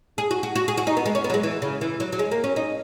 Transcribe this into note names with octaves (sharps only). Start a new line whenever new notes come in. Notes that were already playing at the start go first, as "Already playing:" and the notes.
G#4
F#4
F#4
F#4
G#4
F#4
D#4
B3
G#3
C#4
B3
F#3
G#3
E3
C#3
E3
F#3
F#3
G#3
A#3
C#4
D#4